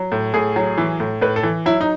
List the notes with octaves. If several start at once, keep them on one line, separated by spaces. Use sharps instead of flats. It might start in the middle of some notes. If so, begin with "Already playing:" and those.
Already playing: F#3
A2
A2 G#4
F#3
E3
A2
A2 B4
A4
E3
F#3 E4
D#4